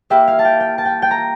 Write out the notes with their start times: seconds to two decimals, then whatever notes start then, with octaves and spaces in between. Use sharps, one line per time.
0.10 A#3 E4 G4 E5
0.28 F5
0.39 A5
0.45 G5
0.60 G5
0.78 A5
0.85 G5
1.02 G5
1.11 A#5